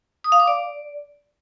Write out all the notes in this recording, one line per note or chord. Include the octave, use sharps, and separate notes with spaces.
D#6
F5
D6
D5